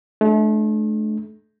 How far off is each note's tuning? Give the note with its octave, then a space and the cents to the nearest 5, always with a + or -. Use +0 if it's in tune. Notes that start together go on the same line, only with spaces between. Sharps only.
A3 -35 D4 +15